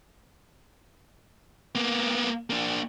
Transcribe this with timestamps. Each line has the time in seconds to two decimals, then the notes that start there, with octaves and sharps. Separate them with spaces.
1.75 A#3 B3
2.50 A#3 D4